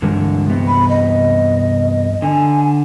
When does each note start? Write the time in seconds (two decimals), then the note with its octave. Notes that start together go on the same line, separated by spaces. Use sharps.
0.02 G2 D3 E3 G#3 A#4
0.46 C3 B3
0.67 B5
0.89 D#5
2.22 D3 G#5